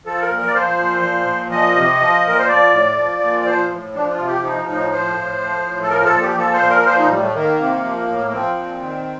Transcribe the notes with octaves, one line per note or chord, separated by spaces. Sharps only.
F3 A4
A#4
A#2
A#4
D5
F3 C5
A#2
F3
A#2
F3 D#5
C3
F3
A#2 A#4
C5
F3 D5
A2
F3
A#2
D5
F3 C5
A2
F3 D4
F4
C3
G4
F3 D#4
A2 D#4
F3 C5
A2
F3
A2
A4
F3 A#4
A4
A#2
G4
F3 A4
C5
A#2
A#4
F3 C5
D#4
A2 G3
A3
D#3 A#3
C3
F3
A2
A#3
F3 C4
A#2
D#3